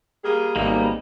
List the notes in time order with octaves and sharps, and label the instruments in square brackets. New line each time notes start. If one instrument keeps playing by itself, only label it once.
[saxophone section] G3 A#3 G#4
[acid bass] G#1 [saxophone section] B2 E3 D#4 [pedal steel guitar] G3 A#3